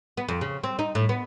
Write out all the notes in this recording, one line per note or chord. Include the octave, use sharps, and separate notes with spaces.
B3
F2
C#3
C4
D#4
A2
B3